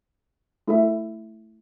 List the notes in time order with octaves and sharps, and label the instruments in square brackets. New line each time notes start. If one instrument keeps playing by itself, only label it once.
[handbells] A3 E4 A4 E5